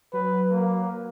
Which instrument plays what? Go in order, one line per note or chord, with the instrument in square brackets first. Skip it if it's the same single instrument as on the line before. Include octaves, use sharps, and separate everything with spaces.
[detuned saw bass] F#3 [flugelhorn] B4
[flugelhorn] A#3